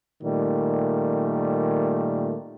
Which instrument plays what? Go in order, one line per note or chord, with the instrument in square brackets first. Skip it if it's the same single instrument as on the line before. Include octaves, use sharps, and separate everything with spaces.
[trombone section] A#2 D#3 G3 A3